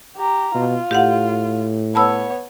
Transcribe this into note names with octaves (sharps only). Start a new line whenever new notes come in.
G4 A#5
B2 F4
A2 G4 F5 F#5
B3 C#5 A5 B5 E6